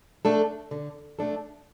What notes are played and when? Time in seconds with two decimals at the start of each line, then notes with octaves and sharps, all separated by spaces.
0.25 A3 D4 A4
0.71 D3
1.19 A3 D4 A4